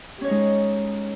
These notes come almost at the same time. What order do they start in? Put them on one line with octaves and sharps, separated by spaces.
G4 C#4 C#5 D#4 G#3